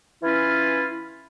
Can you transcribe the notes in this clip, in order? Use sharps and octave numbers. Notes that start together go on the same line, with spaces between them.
E3 C#4 E4 F4 B4 F6